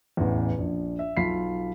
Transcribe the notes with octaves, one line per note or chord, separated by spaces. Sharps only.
A1 E2
A#1
E5
B1 F4 F5 B5 B6 C7